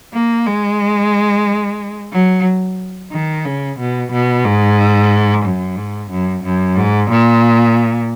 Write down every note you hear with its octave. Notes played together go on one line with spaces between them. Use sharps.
A#3
G#3
F#3
D#3
C#3
B2
B2
G#2
F#2
G#2
F#2
F#2
G#2
A#2